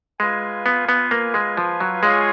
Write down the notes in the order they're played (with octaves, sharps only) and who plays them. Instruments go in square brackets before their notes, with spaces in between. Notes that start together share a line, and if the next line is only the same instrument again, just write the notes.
[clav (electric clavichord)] G#3 [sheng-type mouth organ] F4 B4 F5 G#5
[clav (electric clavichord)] B3
B3
A#3
G#3
F3
F#3
[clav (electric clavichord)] G#3 [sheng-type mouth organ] F4 G#4 C#5 F5 G#5